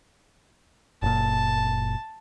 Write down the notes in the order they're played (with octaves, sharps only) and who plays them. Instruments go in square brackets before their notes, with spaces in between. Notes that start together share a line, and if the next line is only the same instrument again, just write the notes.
[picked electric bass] F#1 A#2 [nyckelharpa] A5